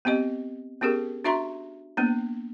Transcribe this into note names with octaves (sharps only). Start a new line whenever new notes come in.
B3 C4 G4 D#5
B3 C#4 G4 G#4 A#4
D4 F#4 E5 A#5 C6
A#3 B3 D4